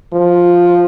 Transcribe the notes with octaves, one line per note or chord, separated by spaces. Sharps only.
F3